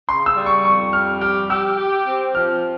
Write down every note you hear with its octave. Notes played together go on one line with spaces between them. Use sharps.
C#3 C6
E6
G3
C#6
F2 C#6
G3 F6
G4 F6
G4 E6
G4
C4
F3 F6